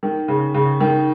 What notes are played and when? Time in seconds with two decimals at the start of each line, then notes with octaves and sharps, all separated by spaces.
0.03 D#3
0.28 C#3
0.54 C#3
0.80 D#3